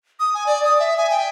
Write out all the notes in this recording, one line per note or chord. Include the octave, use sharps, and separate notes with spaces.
D#6
G#5
D5
D#6
E5
G#5
G5